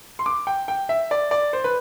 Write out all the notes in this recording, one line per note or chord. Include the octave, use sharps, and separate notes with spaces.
C6
D6
G5
G5
E5
D5
D5
C5
B4